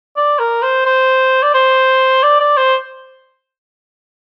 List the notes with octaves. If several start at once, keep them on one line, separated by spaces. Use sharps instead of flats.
D5
A#4
C5
C5
D5
C5
D5
D5
C5